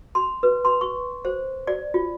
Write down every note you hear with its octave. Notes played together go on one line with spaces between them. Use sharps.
C6
B4
C6
C#6
C5
D5
F4